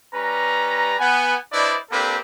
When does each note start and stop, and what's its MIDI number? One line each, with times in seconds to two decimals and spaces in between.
0.13 0.95 55
0.13 0.95 61
0.13 0.95 71
0.13 0.95 82
0.98 1.36 59
0.98 1.36 78
0.98 1.36 80
1.53 1.76 62
1.53 1.76 64
1.53 1.76 71
1.53 1.76 72
1.53 1.76 74
1.53 1.76 75
1.91 2.17 58
1.91 2.17 60
1.91 2.17 62
1.91 2.17 67
1.91 2.17 69
1.91 2.17 71